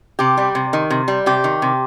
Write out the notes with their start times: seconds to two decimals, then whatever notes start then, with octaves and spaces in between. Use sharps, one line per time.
0.19 C3 G4
0.37 G3
0.55 C3
0.73 D#3
0.90 C3
1.08 G3
1.26 C3 G4
1.44 D#3
1.62 C3